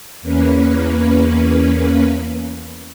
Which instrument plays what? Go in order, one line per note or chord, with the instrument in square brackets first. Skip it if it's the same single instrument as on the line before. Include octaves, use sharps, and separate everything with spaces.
[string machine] E2 A#3 C#4 B4